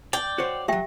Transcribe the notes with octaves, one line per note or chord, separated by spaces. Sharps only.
D5 G5
F#4 C5 C#5
F#3 A3 G4 E5 G5